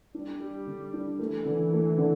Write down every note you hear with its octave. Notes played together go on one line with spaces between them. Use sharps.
G3 D4
G4
D3
D4
E3 A3
D3
A3
D3